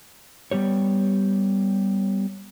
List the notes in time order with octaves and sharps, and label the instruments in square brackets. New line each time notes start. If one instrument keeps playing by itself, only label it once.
[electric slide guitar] G3 B3 G4 C#5